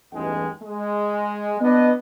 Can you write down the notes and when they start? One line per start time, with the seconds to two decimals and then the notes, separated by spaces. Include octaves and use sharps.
0.12 A1 E2 G2 G#3 D#4 G5
0.62 G#3
1.60 B3 D4 D#5